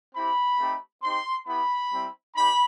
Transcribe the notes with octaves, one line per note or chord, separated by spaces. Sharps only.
C4 E4 G4 B5
A3 C4 D#4 G4
C4 D#4 G4 C6
B3 E4 G4 B5
G3 C4 E4
C4 D#4 G4 B5